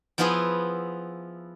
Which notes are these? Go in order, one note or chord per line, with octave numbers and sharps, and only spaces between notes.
F3 B3 E4 F4 G#4 B4